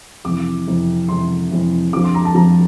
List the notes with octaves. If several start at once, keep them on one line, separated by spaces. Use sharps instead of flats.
F2 C3 E3 D6
F2 C3 E3
F2 C3 E3 C6
F2 C3 E3
F2 D3 F3 D6
C6
A#5
A5
F2 D3 F3 A#5